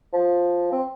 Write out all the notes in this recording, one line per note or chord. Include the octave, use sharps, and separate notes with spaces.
F3
C4